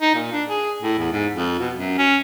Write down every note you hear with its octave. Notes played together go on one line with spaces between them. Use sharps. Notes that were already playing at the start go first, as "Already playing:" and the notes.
D#4
A#2
D4
G#4
A2
E2
G#2
F2
B2
F#2
C#4